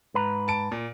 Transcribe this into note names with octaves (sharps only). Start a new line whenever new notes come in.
G#2 B4 A#5
A5 D7
A#2